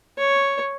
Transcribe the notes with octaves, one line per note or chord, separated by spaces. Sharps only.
C#5